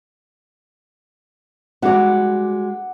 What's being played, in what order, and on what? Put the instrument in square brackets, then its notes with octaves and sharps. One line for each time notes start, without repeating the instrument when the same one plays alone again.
[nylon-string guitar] G3 G#3 F#4 [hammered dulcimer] F#5 D6